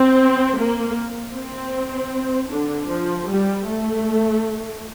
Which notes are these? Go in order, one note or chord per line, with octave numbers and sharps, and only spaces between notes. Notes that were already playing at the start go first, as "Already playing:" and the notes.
Already playing: C4
A#3
C4
D3 D4
F3
G3
A3